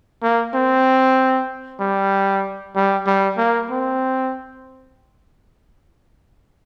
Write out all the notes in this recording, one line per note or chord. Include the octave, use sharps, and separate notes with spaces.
A#3
C4
G3
G3
G3
A#3
C4